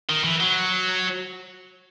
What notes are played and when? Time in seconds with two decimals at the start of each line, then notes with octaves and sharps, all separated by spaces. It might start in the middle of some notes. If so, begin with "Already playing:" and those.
0.10 D#3
0.24 E3
0.41 F#3